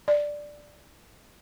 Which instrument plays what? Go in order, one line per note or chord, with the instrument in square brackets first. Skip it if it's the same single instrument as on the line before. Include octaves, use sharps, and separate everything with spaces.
[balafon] D5